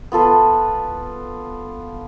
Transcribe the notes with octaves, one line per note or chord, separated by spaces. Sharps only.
B3 F4 A4 B4